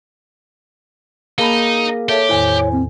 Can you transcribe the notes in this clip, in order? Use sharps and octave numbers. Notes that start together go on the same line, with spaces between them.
A#3 D#4 G#4 A#4 F5 A5 B5
G4 A4 C#5 E5 A5
E2 A2 D#3 E4 C5 G#5
C4